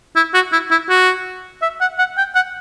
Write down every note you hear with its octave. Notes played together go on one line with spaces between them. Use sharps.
E4
F#4
E4
E4
F#4
E5
F#5
F#5
G5
F#5